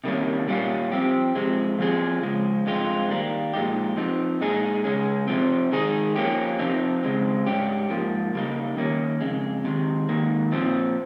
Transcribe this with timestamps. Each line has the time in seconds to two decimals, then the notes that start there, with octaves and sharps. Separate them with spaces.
0.04 C3 D#3 G3 A#3 C#4
0.48 A#2 G3 C#4 F4
0.92 F3 C4 G4
1.35 C3 F3 G#3
1.79 F3 C4 F4 G#4
2.23 C#3 F3 G#3
2.66 G2 F3 G#3 C4 F4
3.10 D#3 G3 A#3
3.54 A#2 F3 G#3 D#4 G4
3.97 F3 C4 D#4
4.41 A#2 G#3 D#4 G#4
4.84 C#3 G#3 C#4 G#4
5.28 C3 F3 C4
5.72 D#3 G#3 D#4 G#4
6.15 F3 A#3 C#4 G4
6.59 F2 C3 F3 C4 D#4
7.03 C#3 G#3 C4
7.47 G#2 G3 C#4 G4
7.90 G#2 F3 A#3
8.34 C#3 G3 A#3 D#4
8.77 D#3 A#3 C#4
9.21 F2 C#3 G#3
9.65 C3 D#3 G#3
10.09 G#2 D#3 A#3
10.52 A#2 F3 C4